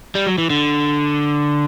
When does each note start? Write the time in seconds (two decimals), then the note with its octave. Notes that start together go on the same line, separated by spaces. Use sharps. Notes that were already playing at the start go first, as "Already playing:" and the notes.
0.15 G3
0.27 F#3
0.38 E3
0.50 D3